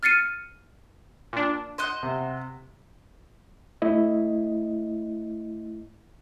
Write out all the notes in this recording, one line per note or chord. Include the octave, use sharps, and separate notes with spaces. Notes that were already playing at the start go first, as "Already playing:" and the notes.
F6 A6 C7 C#7 D#7
A#2 D4
C5 D#5 F#5
C3
A3 E4 D#5